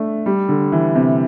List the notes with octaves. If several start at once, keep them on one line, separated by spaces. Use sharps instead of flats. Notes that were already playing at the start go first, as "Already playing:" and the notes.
Already playing: A3 D4
G3
D3
E3
C3